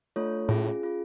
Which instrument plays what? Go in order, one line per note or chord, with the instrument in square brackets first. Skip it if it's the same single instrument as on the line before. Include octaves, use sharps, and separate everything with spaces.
[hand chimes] A3 D4 F4 A4 C#5
[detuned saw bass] A2 [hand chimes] C#4 F4 G#4
[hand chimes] C#4 F4 G#4